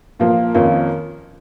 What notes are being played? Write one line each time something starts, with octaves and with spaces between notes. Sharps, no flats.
A#2 F3 A#3 F4
F2 D#3 A#3 C#4 F4